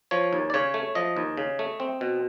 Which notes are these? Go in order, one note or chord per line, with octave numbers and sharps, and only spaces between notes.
F3 C#5
D#2
D5
C#3 C#5
A3
F3 D#5
D#2
C#3
A3
C4
B2